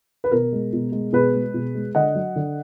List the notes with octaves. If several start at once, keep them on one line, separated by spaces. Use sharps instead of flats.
B4
B2 A#4
G#3
B2
G#3
B2 G#4 B4
G#3
B2
G#3
D3 D#5 F#5
F#3
D3